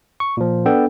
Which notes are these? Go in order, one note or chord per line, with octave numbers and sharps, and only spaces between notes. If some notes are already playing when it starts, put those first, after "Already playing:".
C#6
A#2 F3
B3 D4 A4 G5